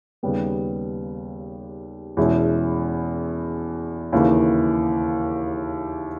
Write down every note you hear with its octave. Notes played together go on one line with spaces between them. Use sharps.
D#2 C#3 G3 B3
E2 B2 G#3 C#4 E4
D#2 C#3 E3 A#3